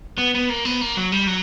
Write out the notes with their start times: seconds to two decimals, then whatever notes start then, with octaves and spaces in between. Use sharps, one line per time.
0.18 B3
0.34 B3
0.49 A#3
0.65 B3
0.81 A#3
0.97 F#3
1.12 G3
1.27 F#3